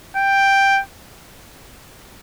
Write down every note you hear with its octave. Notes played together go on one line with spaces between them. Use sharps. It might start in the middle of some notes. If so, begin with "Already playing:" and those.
G5